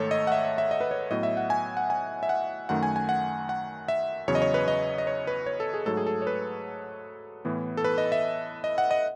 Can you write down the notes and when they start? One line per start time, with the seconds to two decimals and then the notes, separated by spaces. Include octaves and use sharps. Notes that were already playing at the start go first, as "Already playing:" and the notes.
Already playing: G#2 D#3 A3 A4 C#5
0.11 D#5
0.27 F#5
0.32 E5
0.45 E5
0.58 E5
0.71 D#5
0.81 B4
0.91 C#5
1.11 A2 F#3 B3 D#5
1.23 E5
1.37 F#5
1.50 G#5
1.77 F#5
1.90 G#5
2.23 E5
2.29 F#5
2.69 F#2 D#3 A3 F#5
2.83 G#5
2.96 G#5
3.09 F#5
3.49 F#5
3.88 E5
4.28 E2 C#3 F#3 C#5
4.35 D#5
4.42 C#5
4.54 B4
4.68 D#5
4.98 D#5
5.07 C#5
5.27 B4
5.46 C#5
5.60 A4
5.74 G#4
5.86 G#2 F#3 A3 A4
5.97 G#4
6.06 A4
6.22 C#5
6.27 B4
7.45 A2 E3 B3
7.77 A4
7.84 B4
7.98 D#5
8.12 E5
8.64 D#5
8.78 F#5
8.91 D#5